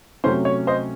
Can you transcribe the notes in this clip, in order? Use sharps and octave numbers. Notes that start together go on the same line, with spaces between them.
C3 F#3 A3 C#4 C5
C#5
C5 D#5